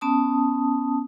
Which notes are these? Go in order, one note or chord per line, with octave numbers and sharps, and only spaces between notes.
B3 C#4 A5 D#6